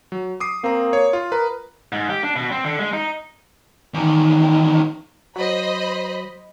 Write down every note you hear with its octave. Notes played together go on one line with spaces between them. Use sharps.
F#3
D6 D#6 C7
A#3 C4 A#5
C#5
F4
A#4 B4
G#2
G4
D4
B2
C4
D3
G#3
D#4
E2 D#3
F#3 C5 D#5 B5